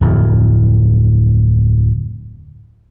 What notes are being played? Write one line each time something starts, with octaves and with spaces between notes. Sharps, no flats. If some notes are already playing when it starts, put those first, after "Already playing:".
D1 F2